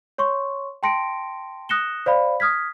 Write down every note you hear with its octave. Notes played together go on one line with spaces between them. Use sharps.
C#5 C6 C#6
G5 A5 C6 A#6 C#7 D7
D#6 F#6 A#6 C#7 E7 G7
C5 D5 F5 B5
D#6 F6 G#6 B6